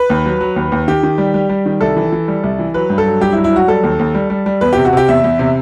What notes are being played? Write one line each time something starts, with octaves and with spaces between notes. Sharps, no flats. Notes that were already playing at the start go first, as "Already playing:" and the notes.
Already playing: B4
D#2
F#3
F#3
D#2
D#2
D#3 G4
D#3
G3
G3
G3
D#3
C2 A4
E3
E3
G3
C2
E3
F#3 B4
G2
A4
F#3
G2 G4
E4
F#3
E4
F#3 F#4
G3 A4
D#2
D#2
G3
G3
G3
E2 B4
C3 G4
F#4
C3 G4
E2 E5
E2
C3